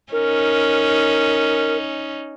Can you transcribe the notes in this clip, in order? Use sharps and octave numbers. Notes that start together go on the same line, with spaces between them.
C#4 D#4 A#4